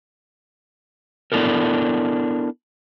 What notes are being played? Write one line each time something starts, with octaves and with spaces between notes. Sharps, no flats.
B3 D4 E4 A4 A#4